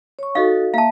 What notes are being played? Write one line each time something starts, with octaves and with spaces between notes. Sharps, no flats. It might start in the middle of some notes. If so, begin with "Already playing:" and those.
C#5 C#6
D#4 F#4 A4 D#5 F5
A#3 E5 F5 A5